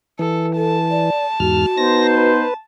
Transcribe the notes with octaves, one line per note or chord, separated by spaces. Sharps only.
E3 A4
A4 A5
D5
E2 G#2 F#4 F6
B3 D#4 C5 A#6
B4